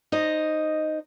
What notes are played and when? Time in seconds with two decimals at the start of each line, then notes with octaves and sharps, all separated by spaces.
0.12 D#4 C5 D#5